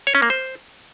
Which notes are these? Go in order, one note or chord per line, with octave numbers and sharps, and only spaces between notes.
C#5
C#4
A#3
C5